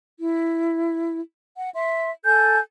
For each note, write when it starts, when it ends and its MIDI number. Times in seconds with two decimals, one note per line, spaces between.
0.18 1.19 64
1.57 1.69 78
1.74 2.08 76
1.74 2.08 84
2.24 2.58 69
2.24 2.58 80
2.24 2.58 91